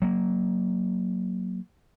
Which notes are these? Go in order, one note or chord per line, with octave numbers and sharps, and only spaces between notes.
F#3 A#3